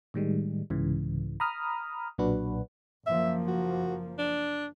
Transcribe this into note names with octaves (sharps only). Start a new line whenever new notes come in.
A2 D#3 G3 G#3
C2 G#2 C#3 E3
A#5 B5 D#6 F6
B1 A#2 F#3 D4 F#4 B4
F#1 F3 A#3 E5
F#4
D4